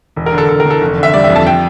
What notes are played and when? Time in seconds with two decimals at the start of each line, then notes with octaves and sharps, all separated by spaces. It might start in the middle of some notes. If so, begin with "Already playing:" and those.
0.16 E1
0.26 A#4
0.32 D3
0.38 A4
0.49 E1 A4
0.60 A#4
0.65 E2
0.70 A4
0.81 F1
0.97 D3
1.03 E5
1.14 G3 D5
1.24 E5
1.30 F2
1.36 A5
1.47 G5